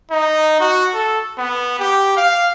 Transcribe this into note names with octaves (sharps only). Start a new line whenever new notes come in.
D#4
F#4
A4
B3
G4
F5